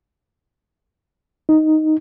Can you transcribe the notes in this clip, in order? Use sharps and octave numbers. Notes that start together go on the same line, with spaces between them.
D#4